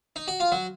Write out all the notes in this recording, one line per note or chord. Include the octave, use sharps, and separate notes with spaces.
D#4
F#4
F4
F#3